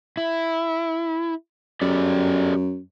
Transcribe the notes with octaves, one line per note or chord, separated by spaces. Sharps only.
E4
F#2 G4 A4 D5